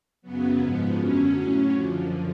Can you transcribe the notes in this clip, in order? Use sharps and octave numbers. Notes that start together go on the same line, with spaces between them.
F#2 C#3 F#3 B3
G#2 F3 B3
F#2 D3 F#3 C#4
A2 F#3 C#4
F#2 D3 F3